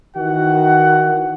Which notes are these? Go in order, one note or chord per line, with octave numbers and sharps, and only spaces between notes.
D#3 E3 F#4 F#5